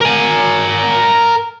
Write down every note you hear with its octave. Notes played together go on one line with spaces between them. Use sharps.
A#4 G#5